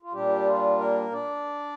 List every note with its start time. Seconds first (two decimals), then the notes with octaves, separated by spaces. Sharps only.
0.03 F4
0.12 A#2 G3 D4 G4
0.46 F4
0.78 A#3 A#4
1.12 D4 D5